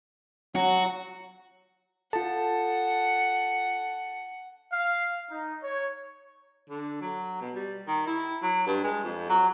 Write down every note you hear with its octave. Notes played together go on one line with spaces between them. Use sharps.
F#3 F#4
F4 A4 F#5 A5
F5
D#4
C#5
D3
F#3
B2
G3
D#3
E4
F#3
G2
G#3
F2
F#3